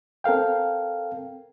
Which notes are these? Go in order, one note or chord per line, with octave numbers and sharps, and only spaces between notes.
C4 A4 A#4 F5 G5